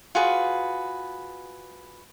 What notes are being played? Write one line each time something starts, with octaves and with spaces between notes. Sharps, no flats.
F4 F#4 G#4 B4